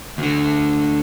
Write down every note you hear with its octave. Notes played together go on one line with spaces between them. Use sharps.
D2 D3